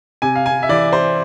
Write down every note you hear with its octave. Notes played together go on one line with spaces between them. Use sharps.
C3 G#5
F5
G#5
E5
E3 D5
C5